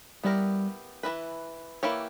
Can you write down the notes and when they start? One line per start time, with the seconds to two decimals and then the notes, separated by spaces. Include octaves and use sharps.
0.23 G3 B3 E4 G4 A#4
1.03 E3 A#3 E4 B4
1.83 E3 A#3 E4 G4 C#5